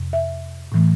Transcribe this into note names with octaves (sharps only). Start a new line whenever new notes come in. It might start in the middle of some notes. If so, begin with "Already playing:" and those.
Already playing: F2 C3
E5
A2 E3 A3